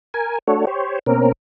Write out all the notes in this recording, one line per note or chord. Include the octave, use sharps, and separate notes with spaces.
A#4 G#5
A3 D4 F#4 A4 C#5
G4 C5 C#5
B2 A#3 C4 C#4 A#4